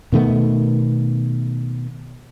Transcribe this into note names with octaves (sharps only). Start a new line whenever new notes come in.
B2 D#3 A3 B3